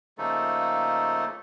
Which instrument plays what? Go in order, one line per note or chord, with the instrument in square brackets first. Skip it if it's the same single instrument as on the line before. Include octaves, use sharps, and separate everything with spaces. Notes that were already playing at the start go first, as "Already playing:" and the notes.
[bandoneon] C#3 F3 A3 A#3 D#4 A4